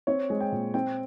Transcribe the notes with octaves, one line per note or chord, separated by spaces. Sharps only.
C4 C#5
G#3
G5
A#2
C4 G5